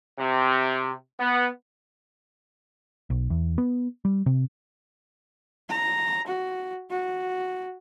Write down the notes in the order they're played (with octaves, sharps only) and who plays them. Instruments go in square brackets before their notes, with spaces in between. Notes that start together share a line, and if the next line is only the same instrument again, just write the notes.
[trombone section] C3
B3
[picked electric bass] B1
E2
B3
G3
C3
[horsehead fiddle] A#5
F#4
F#4